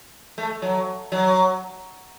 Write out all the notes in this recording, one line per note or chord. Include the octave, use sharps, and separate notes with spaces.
A3
F#3
F#3